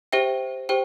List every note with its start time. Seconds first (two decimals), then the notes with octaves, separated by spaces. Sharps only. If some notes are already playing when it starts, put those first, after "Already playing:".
0.13 G4 C5 E5 G5
0.69 G4 C5 G5